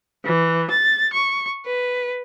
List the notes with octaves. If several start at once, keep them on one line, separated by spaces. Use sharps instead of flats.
E3
A6
C#6
B4